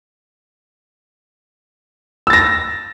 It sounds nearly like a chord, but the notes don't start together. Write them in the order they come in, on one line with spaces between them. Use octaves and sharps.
E6 A6 A#6